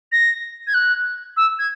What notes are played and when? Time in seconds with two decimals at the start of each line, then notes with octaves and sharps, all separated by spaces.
0.12 A#6
0.67 G#6
0.74 F#6
1.37 E6
1.59 G#6